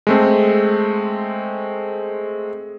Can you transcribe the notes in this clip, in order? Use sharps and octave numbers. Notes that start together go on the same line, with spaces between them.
G#3 A3 C4